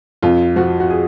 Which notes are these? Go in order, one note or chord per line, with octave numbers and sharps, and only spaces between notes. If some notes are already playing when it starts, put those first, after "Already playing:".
F2 F4
F3 F#4
F#4
G#4